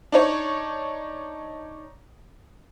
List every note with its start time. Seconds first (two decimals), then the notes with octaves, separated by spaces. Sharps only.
0.12 D4 D#4 C#5